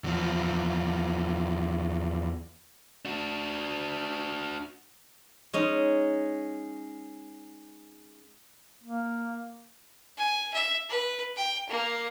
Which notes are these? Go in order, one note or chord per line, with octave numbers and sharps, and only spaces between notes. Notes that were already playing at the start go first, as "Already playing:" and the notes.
E2 F3
D4 F#4
G#3 C#4 D#4
A#3
G#5
E5
B4
G5
A#3